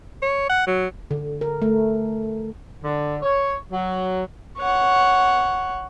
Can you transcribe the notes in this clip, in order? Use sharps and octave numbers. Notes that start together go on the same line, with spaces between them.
C#5
F#5
F#3
D3
A#4
A3
D3
C#5
F#3
C#5 F#5